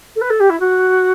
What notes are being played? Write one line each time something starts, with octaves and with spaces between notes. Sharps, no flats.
A4
B4
A4
G4
E4
F#4